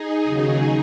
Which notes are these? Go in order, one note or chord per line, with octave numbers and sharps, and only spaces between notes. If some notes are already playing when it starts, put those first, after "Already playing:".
Already playing: D#4 G#4
D#2 C#3 F#3